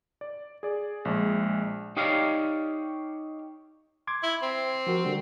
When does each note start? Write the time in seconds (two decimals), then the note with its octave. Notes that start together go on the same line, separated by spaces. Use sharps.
0.21 D5
0.63 G#4 D5
1.05 A#1 G#3
1.97 D#4 G4 C#5 D5 F5
4.07 C6 D6 G#6
4.23 E4
4.42 C4
4.87 F3 F#4 A#4
5.05 D3 G3